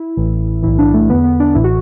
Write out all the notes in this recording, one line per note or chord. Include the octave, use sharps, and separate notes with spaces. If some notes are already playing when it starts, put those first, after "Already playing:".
Already playing: E4
A1 A2 E3
B1 A2 E3 E4
D4
A3
E2 D3 B3
B3
D4
A1 A2 E3 E4
F#4